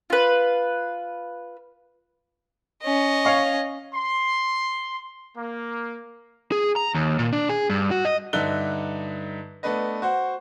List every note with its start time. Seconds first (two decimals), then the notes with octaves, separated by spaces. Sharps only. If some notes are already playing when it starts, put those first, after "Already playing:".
0.10 F4 B4
2.82 C#4 D#5
3.25 C#5 F5 C#6
3.95 C6
5.37 A#3
6.52 G#4
6.76 A#5
6.95 D#2
7.19 A#2
7.33 D4
7.49 G#4
7.70 G2
7.91 F#4
8.05 D#5
8.33 G2 D3 D#4 E5 F#6 G7
9.63 A3 B3 D4 B4 D#5
10.02 F#4 C5 F#5